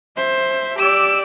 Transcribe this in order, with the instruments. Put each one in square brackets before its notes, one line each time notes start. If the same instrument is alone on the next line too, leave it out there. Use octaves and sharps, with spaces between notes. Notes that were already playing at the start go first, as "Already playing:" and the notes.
[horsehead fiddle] C5 E5
[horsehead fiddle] G4 D5 [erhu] E6